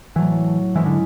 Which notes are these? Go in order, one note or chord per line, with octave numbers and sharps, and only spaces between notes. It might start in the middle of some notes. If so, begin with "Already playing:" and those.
A2 E3 F#3 A3
G#2 E3 G#3 C#4 E4
D3